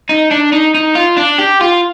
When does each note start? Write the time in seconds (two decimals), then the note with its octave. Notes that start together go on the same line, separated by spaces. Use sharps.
0.09 D#4
0.31 D4
0.52 D#4
0.75 D#4
0.96 F4
1.17 D4
1.39 G4
1.61 F4